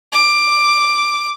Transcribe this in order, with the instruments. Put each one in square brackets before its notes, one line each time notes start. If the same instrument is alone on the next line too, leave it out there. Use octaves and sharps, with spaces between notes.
[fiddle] D6